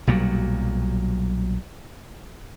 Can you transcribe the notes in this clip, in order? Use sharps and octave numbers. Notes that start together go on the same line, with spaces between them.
B1 A#2 F#3 G3